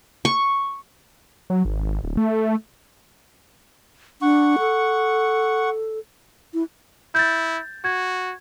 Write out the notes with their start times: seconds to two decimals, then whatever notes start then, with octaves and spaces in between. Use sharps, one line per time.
0.25 C#6
1.50 F#3
1.65 G#1
2.04 D1
2.17 A3
4.22 D4 F#5 C#6
4.59 A4
6.54 E4
7.15 E4 G6 A6
7.84 F#4 G#6